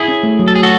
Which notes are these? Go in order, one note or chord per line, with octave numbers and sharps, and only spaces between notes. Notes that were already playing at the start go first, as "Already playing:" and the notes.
Already playing: E4 G#4
C#4
A3
F#3
A4
A3 G#4
F#4 A4